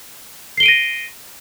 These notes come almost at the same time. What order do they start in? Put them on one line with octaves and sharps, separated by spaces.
C7 G7 D7 D#7 A#6